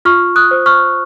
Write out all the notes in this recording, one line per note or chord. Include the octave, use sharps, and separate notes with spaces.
F4 C#6 F6
D#6 F#6
C5
C#6 F6